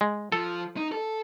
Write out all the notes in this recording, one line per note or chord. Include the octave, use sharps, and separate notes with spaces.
G#3
F3 A4
D#4
A4